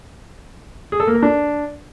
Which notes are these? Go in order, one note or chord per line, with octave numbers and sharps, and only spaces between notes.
G#4
A4
A#3
A#4
D4